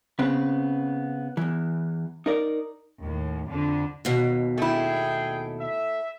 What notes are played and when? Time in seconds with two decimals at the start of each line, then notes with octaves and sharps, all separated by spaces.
0.19 C#3 B3 C4 B4
1.37 E2 E3
2.26 D#4 A#4 D5
3.02 D#2 A2
3.48 F2 D3
4.05 D#2 B2
4.58 A3 E4 G#4 G5
5.60 E5